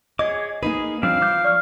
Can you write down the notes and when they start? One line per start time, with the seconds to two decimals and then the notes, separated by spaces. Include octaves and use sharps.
0.19 G#4 C#5 D#5 D6
0.63 A#3 D#4 G#4 B4
1.03 F3 G3 C4 D4 F5
1.21 E3 D6 G6
1.44 D5 C#6 F6